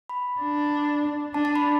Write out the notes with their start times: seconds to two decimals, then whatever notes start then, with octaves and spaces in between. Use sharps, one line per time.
0.09 B5
0.41 D4
1.34 D4 A5
1.45 A5
1.56 B5